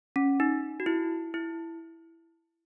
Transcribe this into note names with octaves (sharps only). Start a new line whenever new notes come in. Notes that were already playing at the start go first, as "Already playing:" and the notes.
C#4
D#4
F#4
E4
E4